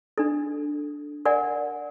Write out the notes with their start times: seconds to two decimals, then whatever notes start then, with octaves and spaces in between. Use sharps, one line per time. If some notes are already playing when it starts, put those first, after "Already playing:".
0.18 D4 A4
1.25 A#4 D5 F#5 G#5